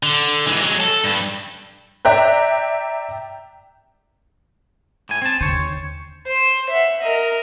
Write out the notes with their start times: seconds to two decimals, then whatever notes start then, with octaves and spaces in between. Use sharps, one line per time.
0.03 D3
0.47 E3 G#3
0.62 F#3 G#3
0.80 A4
1.04 G2
2.05 D5 E5 G5 A#5 F#6 G6
5.09 A2 G#5
5.22 C4 A5
5.41 D#2 D3 C5 C#5
6.26 C5
6.69 E5 F#5
7.02 A#4 D#5